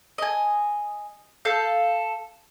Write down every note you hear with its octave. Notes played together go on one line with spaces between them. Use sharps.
D#5 G#5
A4 F5 G6